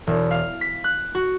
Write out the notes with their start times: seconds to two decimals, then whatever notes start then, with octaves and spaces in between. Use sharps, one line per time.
0.07 E1
0.31 F5
0.61 B6
0.84 F#6
1.15 F#4